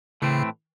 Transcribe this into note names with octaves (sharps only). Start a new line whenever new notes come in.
A2 C#3 E3 A3 C4